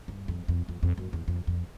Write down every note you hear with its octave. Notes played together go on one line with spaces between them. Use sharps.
G2
F2
F2
F2
F2
F#2
E2
F2
F2